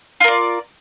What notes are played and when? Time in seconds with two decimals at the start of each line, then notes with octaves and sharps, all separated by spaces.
0.20 F4
0.24 A#4
0.28 D5